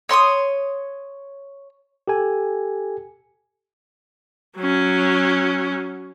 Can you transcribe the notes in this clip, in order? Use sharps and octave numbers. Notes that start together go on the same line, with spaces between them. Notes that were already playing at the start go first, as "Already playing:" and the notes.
C#5 C6 D6 D#6
G4 A4 G#5
F#3 C#4